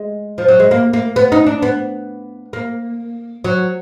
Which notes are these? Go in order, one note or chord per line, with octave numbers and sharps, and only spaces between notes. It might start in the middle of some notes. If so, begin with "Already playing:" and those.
Already playing: G#3
F3
F#3
G#3
A#3
A#3
B3
D#4
D4
B3
A#3
F#3